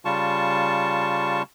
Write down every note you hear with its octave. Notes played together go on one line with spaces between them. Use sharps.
C#3 G3 F4 A5 C#6